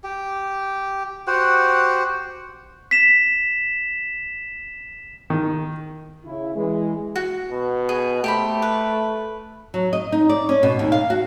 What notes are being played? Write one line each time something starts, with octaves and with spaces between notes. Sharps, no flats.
G4
F#4 G4 C5 F#5
B6 E7
D#3
C#3 E4
E3 G#3
F#4
B2
G#4
A3 G4 C5 B5
B4
F#3
D#5
D#4
D5
C#4
B2
D#2
F5
F#4